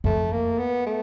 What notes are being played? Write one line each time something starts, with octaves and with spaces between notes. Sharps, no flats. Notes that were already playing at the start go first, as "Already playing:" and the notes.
F2 A3
A#3
B3
A3